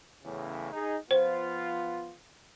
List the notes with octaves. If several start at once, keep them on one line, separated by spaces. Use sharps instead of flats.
E2 A2 C#3
D#4 G#4
F3 B3 F4 C5